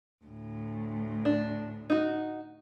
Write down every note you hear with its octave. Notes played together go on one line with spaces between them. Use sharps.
D2 A2
D4
D#4 F#4